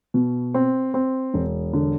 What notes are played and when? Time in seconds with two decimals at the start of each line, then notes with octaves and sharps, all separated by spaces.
0.14 B2
0.54 C4
0.94 C4
1.34 E1
1.73 D3